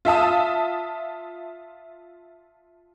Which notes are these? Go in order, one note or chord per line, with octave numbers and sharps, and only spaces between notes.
F4 E5 A5 D#6